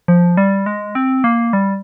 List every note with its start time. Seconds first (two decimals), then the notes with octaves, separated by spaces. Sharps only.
0.08 F3
0.37 G3
0.66 G#3
0.95 C4
1.24 A#3
1.53 G3